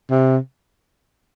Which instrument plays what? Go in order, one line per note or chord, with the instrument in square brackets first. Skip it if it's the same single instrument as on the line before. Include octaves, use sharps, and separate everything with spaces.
[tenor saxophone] C3